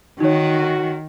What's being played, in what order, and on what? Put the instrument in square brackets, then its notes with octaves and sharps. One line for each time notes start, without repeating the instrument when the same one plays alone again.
[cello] D#3 [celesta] D#4 C#5 [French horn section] F#4